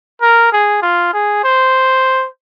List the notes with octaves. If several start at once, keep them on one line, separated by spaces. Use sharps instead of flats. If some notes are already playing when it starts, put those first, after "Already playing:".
A#4
G#4
F4
G#4
C5